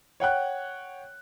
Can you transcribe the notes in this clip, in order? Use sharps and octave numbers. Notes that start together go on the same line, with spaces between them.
C#5 F#5 G5 F#6